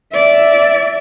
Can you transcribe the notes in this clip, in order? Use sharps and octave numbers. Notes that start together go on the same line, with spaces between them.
D5 E5